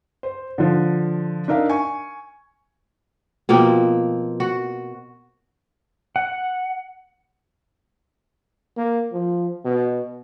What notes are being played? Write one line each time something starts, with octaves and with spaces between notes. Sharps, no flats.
C5
D3 F3
D4 D#4 A#4 E5 F5
G#5 C#6
B2 F3 A#3 C4
F#4
F#5
A#3
F3
B2